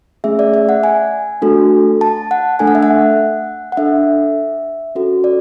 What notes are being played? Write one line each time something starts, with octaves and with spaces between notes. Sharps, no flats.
A3 C#4 G#4 E5
D5
E5
F#5
G#5
A3 D4 F#4 A4
A5
F#5
A3 D4 A4 G#5
F#5
E5
F#5
F#5
D4 A4 E5
C#4 F#4 A4
D5